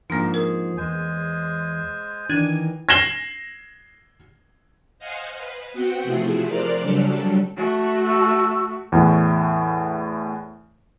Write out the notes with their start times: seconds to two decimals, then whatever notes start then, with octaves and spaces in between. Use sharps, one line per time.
0.10 G#2 F3 A#3 D4 A#4 F5
0.34 G#4 A#4
0.77 E2 G#3 C5 G#5
2.29 D#3 E3 D4 G#6 D#7
2.89 G#6 A#6 C7 E7 F#7 G7
4.99 C5 D#5 F5 F#5 G#5
5.37 B4
5.72 B3 C4 F#4 F#5 G5
6.03 C3 F3 A3 C4 E4 G#4
6.47 A#4 C5 D5 D6 F6 F#6
6.80 C#3 F#3 G3 C#4 D4 A4
7.57 A3 F#4
8.04 A5 C#6 E6
8.92 E2 A2